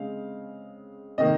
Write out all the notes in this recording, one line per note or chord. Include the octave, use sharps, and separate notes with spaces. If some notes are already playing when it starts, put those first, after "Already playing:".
Already playing: C#3 G#3 C4 F5
C3 D#3 A#3 D#5